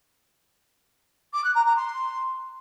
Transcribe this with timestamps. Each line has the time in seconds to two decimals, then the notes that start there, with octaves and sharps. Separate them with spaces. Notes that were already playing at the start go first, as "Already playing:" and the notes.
1.33 D6
1.44 F#6
1.55 A#5
1.66 A#5
1.77 C6